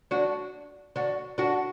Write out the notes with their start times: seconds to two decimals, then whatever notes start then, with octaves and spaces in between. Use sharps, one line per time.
0.11 D4 F#4
0.96 D4 F#4
1.38 D4 F#4